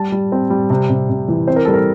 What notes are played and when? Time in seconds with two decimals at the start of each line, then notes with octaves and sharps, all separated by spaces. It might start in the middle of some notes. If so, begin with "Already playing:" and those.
Already playing: G3 A5
0.12 G3
0.32 C4
0.50 G3
0.70 C3
0.90 C3
1.09 C3
1.28 E3
1.47 C4 C5
1.56 A#4
1.65 G3 A4
1.74 A#4